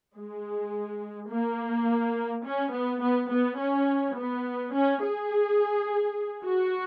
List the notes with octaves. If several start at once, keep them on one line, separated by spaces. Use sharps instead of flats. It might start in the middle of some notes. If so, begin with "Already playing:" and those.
G#3
A#3
C#4
B3
B3
B3
C#4
B3
C#4
G#4
F#4